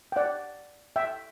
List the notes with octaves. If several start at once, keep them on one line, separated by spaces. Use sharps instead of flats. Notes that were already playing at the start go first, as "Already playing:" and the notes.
G5
D5 F#5
E5 G5